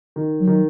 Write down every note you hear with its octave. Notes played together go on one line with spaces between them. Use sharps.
D#3
F#3
D#3